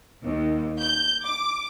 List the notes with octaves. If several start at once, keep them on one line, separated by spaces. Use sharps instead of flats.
D#2
G6
D6